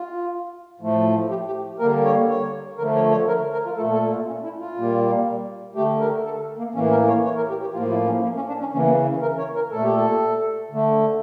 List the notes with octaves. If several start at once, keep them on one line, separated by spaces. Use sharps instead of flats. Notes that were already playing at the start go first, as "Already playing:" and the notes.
Already playing: F4
A2 F3 A3
G4
G4
D3 G3 A#3 A#4
C#5
C#5
D3 F3 A3 A#4
C#5
C#5
A#4
A#4
F4
A#2 A3 A4
A4
F4
C#4
E4
F4
A#2 G3 A#3
D3 A3 G4
A#4
A4
A#3
A2 E3 A#3 C#4
A#4
C#5
C#5
A#4
G4
G4
A2 F3 A#3 F4
E4
C#4
A#3
C#4
D4
C#4
C#3 E3 A#3 C#4
A#3
C#4
A#4
C#5
A#4
A#2 A3 A4
G4
A4
D3 A3